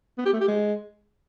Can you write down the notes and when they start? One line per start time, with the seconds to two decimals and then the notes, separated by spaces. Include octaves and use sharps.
0.18 B3
0.25 G4
0.33 A3
0.40 G4
0.48 G#3